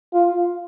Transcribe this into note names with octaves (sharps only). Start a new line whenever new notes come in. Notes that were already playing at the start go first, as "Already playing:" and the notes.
F4